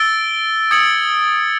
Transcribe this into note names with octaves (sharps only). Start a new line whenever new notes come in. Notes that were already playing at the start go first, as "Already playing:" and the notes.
Already playing: E6 A6 D7 G7
D#6 G#6 C#7 F#7